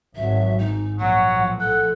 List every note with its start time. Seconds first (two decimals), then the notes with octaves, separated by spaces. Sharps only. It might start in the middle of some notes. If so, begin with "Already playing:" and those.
0.15 G#1 F#3 E5
0.59 G#2 D#4
1.00 A#1 F#3 F#5
1.31 B1 A2 F3
1.60 A4 F#5